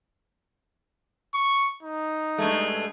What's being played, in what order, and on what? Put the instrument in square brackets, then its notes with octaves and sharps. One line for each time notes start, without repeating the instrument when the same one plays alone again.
[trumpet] C#6
D#4
[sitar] G2 G#3 A3